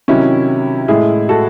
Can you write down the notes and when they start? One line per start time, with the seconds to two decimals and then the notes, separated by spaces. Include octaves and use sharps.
0.08 C3 D#3 F#3 C#4 E4
0.88 A2 G#3 E4 G#4
1.29 F#4 A4